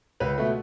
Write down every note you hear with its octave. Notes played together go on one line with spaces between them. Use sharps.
C#2 B4
B2 A3